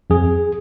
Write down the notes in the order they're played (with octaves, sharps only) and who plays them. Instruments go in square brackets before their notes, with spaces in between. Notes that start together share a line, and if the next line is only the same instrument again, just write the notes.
[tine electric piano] F2 G#4